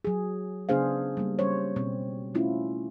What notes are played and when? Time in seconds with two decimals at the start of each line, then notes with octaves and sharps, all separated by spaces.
0.05 F#3 G#4
0.69 C#3 B3 D4 G#4 C5 F5
1.17 G3 A#3
1.39 G3 C#4 C5 C#5
1.76 B2 C4
2.35 A3 C#4 E4 F4